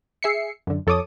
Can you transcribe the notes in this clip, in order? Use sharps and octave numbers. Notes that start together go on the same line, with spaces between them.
G#4 E5 C7 C#7
F#2 D3
F2 A4 C#5 D6 D#6